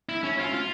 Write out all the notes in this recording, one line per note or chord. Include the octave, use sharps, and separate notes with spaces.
E4
C#4
F4
F4